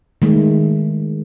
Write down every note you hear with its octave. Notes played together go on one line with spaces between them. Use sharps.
D#3 G#3 A3